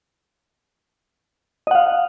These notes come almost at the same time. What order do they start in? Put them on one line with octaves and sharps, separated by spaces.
D#5 F#5 F5